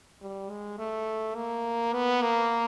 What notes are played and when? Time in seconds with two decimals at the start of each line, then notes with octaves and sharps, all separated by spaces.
0.21 G3
0.50 G#3
0.78 A3
1.35 A#3
1.93 B3
2.22 A#3